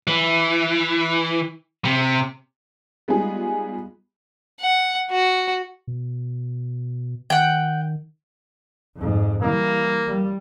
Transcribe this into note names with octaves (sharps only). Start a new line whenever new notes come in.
E3
C3
G3 G#3 B3 D#4 F4 G#4
F#5
F#4
B2
D#3 F#5 G5
F2 G#2
E3 G3 A#3
G3